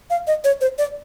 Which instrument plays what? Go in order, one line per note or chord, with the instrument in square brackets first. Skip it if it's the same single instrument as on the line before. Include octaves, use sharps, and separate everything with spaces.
[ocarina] F5
D#5
C#5
C5
D5